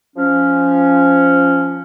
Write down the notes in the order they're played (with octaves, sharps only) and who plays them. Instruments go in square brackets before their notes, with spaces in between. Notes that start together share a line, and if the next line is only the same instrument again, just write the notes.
[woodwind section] F3 C#4